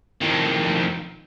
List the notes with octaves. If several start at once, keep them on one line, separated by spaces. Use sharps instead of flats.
F2 D#3